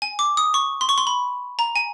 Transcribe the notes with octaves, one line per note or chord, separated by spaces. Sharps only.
G#5
D6
D#6
C#6
C6
C#6
C6
B5
A#5
G#5